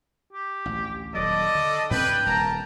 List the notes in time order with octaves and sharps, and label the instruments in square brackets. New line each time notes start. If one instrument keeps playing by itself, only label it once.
[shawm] G4
[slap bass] A1 D2
[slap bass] D#1 F#3 [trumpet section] D4 A4 D#5 [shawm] D5
[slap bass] D3
[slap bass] G#2 C3 C4 [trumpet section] D4 B4 [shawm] G5
[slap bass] D#1 C2 [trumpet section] A#4 A5 A#5